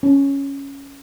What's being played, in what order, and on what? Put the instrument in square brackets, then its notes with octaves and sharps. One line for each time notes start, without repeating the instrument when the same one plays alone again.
[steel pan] C#4